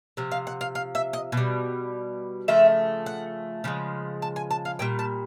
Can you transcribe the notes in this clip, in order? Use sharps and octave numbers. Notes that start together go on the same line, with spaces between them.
C3 F3
F5
F#5
F5
F5
E5
D#5
B2
G3
C#3 F3 A3 E5
F#5
C#3 F3 G#3
A5
G#5
A5
F5
A#2 G3 G5
A5